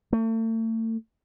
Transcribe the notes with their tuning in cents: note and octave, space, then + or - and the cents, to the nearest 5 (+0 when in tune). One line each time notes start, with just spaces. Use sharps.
A3 +40